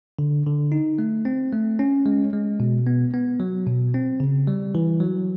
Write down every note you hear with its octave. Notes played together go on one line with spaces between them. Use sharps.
D3
D3
D#4
A3
C4
A3
C#4
G#3
G#3
B2
B3
B3
F#3
B2
C4
C#3
G3
E3
F#3